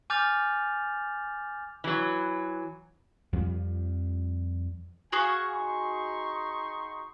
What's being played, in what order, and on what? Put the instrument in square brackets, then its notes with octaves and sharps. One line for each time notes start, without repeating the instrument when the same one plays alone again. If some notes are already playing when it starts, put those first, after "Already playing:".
[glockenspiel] G#5 D6 F6 G6 A6 F7
[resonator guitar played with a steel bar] E3 F#3
[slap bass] F2 F3 G3
[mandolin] F#4 G#4 D#6 [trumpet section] F5 G#5 C#6
[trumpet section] D#4 C6 C#6